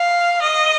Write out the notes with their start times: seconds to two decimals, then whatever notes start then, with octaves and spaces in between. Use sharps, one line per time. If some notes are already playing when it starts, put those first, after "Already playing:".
Already playing: F5
0.42 D#5